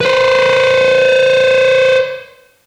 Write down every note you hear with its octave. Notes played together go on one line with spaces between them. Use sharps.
B4 C5